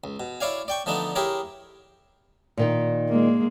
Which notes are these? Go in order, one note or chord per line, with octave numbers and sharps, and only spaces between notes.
C#2
B2
E4 C#5 D5 F5 G#5
D5 G5 C#6
D3 F3 A3 B3 D4 D#4
E4 G4 G#4 A#4 C#5
A#2 D#3 D#4
G#3 A#3